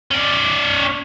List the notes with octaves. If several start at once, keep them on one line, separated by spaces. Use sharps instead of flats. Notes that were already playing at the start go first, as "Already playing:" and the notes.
C#4 D5